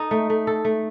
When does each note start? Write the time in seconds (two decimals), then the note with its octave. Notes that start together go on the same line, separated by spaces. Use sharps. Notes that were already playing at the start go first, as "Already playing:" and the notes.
Already playing: D#4 A4
0.11 A3
0.30 A3
0.47 A4
0.65 A3